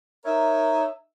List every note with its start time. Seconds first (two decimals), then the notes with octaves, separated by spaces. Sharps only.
0.24 D#4 A#4 C#5 E5